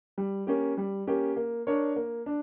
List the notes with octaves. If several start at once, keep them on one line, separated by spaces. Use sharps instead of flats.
G3
A#3 C#4 G4
G3
A#3 C#4 G4
A#3
D4 A#4 C#5
A#3
D4